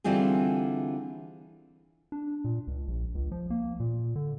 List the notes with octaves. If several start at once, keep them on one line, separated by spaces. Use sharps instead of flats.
D3 E3 G3 C4 F4 G#4
D4
A#2
C#2
A#1
C#2
F3
A#3
A#2
D3